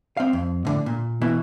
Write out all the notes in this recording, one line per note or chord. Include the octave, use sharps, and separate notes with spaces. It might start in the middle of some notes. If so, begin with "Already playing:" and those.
C4 F5
F2
A2 D3
A#2
B2 E3 E4